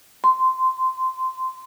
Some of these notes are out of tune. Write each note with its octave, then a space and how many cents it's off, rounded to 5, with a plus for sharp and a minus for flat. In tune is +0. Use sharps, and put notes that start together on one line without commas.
C6 -15